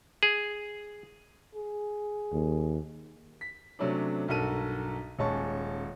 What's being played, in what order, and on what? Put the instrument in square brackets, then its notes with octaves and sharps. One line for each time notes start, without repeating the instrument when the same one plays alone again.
[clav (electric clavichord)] G#4
[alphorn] G#4
[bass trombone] D#2
[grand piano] B6
C3 F#3 A3 C#4 D4
B1 G2 F#4 A4 A#4 D#7
D#1 G#3 C#4 A5 C#6